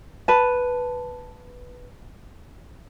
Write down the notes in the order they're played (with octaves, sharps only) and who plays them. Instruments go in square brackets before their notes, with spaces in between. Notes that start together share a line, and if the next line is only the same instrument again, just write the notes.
[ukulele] B4 A5